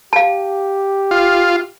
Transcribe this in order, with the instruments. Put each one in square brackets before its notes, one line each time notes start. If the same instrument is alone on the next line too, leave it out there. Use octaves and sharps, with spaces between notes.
[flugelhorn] G4 [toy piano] F5 A5
[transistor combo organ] F4